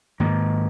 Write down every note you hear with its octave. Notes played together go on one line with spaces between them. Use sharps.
G#2 D#3 A#3